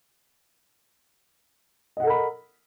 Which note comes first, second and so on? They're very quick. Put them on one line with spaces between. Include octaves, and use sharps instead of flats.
D#5 F#5 A4 A#4 B5